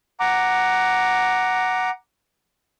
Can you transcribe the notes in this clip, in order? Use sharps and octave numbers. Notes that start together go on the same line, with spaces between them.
F#5 A#5 D6